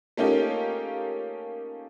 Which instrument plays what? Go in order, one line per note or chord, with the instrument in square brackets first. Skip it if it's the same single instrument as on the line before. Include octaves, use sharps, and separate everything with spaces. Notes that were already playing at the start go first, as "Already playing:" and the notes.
[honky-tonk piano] A3 A#3 C#4 D#4 F4 G4